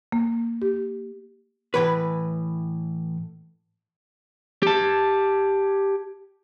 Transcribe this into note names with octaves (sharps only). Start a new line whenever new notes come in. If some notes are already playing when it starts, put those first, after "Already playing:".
A#3
G4
A2 E3 B4
G4 A5